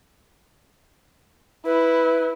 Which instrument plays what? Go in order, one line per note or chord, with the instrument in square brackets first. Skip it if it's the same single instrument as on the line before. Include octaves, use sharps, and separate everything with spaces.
[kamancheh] E4 [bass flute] B4